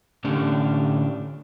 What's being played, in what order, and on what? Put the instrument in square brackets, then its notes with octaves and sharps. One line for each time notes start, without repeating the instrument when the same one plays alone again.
[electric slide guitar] A2 D3 A3 C#4 D4 G4